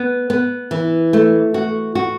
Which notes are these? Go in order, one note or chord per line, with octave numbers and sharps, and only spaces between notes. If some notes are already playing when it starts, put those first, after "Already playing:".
Already playing: B3
B3
E3
A3
F#4
F#4